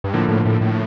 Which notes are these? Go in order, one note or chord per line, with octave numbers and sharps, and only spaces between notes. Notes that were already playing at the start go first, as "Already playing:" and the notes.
G2
A2 D3 F3 A#3
A2
A2
A2